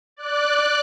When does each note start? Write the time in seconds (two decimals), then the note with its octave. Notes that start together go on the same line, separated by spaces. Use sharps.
0.16 D5 F#6